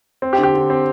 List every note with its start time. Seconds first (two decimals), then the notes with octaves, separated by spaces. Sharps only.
0.22 C4
0.33 G4
0.38 D3
0.43 G4
0.54 D3
0.70 C4